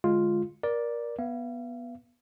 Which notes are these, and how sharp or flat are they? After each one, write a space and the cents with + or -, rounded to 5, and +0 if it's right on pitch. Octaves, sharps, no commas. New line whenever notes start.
D3 +0 G#3 +0 F4 +0
A#4 +25 D5 +0
B3 -15 F5 -45